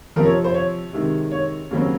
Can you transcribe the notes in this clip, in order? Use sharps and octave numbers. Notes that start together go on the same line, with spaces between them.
C3 F3 C4 A#4
C#5
C5
C#5
C3 D#3 G#3
C#5
D#2 C#3 F#3 C4